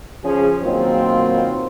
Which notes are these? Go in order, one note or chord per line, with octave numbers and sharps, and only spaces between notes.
C#3 F3 C#4 G#4
B2 D#3 F#3 A#3 C4 F4